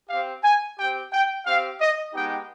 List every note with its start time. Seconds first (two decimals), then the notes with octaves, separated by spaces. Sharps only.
0.09 C4 G4 F5
0.44 G#5
0.78 C4 G4 G5
1.12 G5
1.45 C4 G4 F5
1.81 D#5
2.14 G#3 B3 D#4 G4 G5